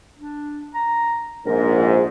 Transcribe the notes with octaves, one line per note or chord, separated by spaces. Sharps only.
D4
A#5
A#1 G#2 A#4